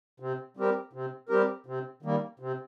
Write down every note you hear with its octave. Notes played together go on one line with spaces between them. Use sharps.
C3
G3 C4 G4 A#4
C3
G3 C4 G4 A#4
C3
D#3 G3 A#3
C3